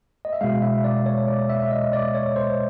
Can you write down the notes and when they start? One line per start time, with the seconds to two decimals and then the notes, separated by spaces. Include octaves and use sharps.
0.25 D#5
0.33 E5
0.41 B2 G#3 F5
0.62 E5
0.84 D5
1.06 C#5
1.28 D5
1.49 E5
1.71 D#5
1.93 D5
2.15 C#5
2.36 C5